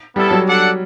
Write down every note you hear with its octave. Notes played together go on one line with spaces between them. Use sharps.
G3 B3 E4 A4
F#3
D4 A4 D5 F#5